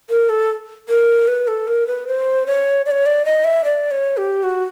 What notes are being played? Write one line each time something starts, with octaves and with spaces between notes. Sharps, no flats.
A#4
A4
A#4
B4
A4
A#4
B4
C5
C#5
D5
C#5
D5
D#5
E5
D5
C#5
G4
F#4